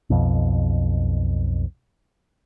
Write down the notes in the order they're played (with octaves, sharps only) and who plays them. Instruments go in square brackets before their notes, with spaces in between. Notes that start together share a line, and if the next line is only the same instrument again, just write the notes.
[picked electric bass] B1 F2 B2